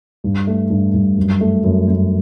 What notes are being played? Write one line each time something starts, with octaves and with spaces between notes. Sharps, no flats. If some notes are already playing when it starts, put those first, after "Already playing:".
G2
A3
G2
G2
F#2
A3
F#2
F#2